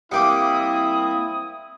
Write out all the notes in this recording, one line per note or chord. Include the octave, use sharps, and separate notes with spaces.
G3 A#3 C4 E4 F#5 G5 D6 D#6